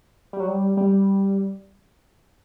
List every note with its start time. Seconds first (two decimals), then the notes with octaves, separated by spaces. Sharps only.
0.33 G3
0.40 F#3
0.48 G3
0.77 G3